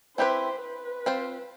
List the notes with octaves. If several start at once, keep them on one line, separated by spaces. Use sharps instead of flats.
C4 E4 G4 B4 C5
B4
C4 F4 C5